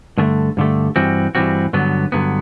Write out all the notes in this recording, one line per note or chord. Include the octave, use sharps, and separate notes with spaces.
G2 D3 A3
G2 D3 A3
G2 E3 G3 C4 F#4
G2 E3 G3 C4 F#4
G2 D3 F#3 B3
G2 D3 F#3 B3